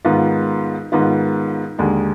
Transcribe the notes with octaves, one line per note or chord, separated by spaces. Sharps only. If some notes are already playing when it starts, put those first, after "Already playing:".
G#2 D#3 B3 F4
G#2 D#3 B3 F4
D#2 D3 G#3